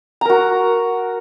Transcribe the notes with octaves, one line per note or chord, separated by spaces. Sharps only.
F#4 A#4 A#5